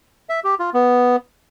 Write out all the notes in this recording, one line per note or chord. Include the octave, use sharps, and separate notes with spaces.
E5
G4
F4
B3